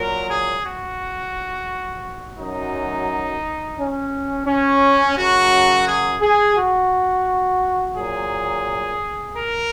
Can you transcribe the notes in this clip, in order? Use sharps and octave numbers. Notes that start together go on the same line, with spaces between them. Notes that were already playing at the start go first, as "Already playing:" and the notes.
Already playing: A#2 F#3 A#4
G#4
F#4
F#2 F#3 D#4
C#4
C#4
F#2 C#3 F#3 F#4
G#4
G#4
F#4
A#2 F#3 G#4
A#4